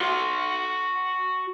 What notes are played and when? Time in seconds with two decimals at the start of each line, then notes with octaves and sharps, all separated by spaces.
0.01 F#4 C6